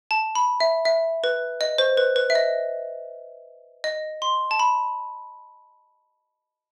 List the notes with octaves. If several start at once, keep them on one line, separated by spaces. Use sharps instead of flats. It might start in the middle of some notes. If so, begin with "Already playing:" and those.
A5
B5
E5
E5
B4
D#5
C5
B4
B4
E5
D#5
D#5
C6
A5
B5